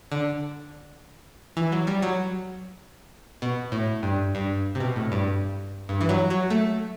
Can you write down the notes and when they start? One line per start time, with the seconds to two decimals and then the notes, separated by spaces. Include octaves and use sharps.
0.12 D3
1.57 E3
1.72 F#3
1.87 G3
2.02 F#3
3.42 B2
3.72 A2
4.03 G2
4.35 G2
4.75 C3
4.80 B2
4.96 A2
5.12 G2
5.89 G2
6.01 E3
6.09 F#3
6.30 F#3
6.50 A3